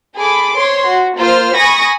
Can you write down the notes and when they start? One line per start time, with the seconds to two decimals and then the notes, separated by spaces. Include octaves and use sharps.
0.18 G#4 A4 B5 D6
0.57 C5 C#5 C6
0.88 F#4
1.19 A#3 F4 C5 F6
1.58 G#5 B5 C#6 D#6 A#6